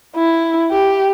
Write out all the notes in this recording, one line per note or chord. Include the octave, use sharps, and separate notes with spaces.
E4
G4